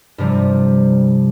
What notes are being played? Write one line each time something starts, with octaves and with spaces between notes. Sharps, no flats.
G2 C3 F3 G3